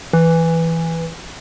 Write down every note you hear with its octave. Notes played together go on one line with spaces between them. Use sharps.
E3